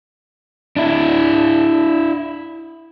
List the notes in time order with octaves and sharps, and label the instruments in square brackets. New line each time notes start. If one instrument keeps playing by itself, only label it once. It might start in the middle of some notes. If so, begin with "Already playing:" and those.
[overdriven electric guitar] D4 E4